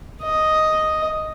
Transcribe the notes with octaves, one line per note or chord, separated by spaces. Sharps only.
D#5